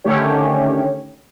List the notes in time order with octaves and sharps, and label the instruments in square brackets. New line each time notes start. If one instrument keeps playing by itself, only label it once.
[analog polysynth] D3 D#3 A3 C#4 G4 C#5